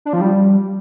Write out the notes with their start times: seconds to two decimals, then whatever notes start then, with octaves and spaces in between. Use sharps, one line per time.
0.05 D4
0.13 F3
0.21 G3